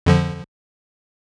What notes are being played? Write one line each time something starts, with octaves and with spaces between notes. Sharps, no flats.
F2 D3 F3